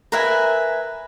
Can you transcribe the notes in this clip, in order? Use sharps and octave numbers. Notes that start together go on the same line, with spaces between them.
A#4 B4 E5 G#5